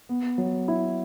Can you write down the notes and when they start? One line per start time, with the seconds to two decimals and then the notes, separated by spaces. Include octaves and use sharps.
0.09 B3
0.38 F#3
0.68 E4